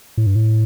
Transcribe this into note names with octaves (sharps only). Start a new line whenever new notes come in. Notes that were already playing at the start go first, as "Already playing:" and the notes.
A2
G2
A2